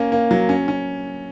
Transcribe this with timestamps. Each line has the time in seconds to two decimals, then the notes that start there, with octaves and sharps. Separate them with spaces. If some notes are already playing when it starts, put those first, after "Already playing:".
Already playing: A#3 C#4
0.12 A#3
0.31 F#3
0.49 C#4
0.68 C#4